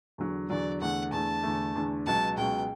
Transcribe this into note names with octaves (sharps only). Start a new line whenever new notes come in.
E2 D3 F#3
E2 D3 F#3 D5
E2 D3 A3 F#5
E2 D3 A3 A5
E2 D3 A3
E2 D3 A3
C#2 B2 F#3 A5
C#2 B2 F#3 G5